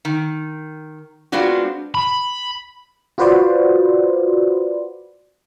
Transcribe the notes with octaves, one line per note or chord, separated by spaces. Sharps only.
D#3
G#3 B3 C4 D4 F4 F#4
B5
F4 F#4 B4 C5 D5